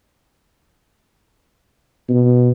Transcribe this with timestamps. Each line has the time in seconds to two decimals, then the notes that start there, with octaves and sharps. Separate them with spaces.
2.09 B2